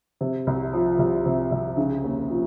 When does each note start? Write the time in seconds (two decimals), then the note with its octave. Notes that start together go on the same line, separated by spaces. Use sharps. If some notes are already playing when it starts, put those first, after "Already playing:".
0.21 C3
0.47 C2
0.73 F3
0.99 C2
1.26 C3
1.51 C2
1.77 C#3
2.04 D#2
2.30 F3